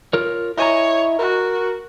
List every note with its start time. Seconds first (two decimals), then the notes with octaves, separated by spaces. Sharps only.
0.13 F4 A#4 C#5
0.58 E4 C#5 D#5 G#5 A#5
1.19 F#4 A#4